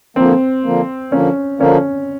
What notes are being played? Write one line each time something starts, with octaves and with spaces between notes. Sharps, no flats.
D3 F3 A#3 C4
D3 F3 A#3
D3 F3 A#3 C#4
D3 F3 A#3 C#4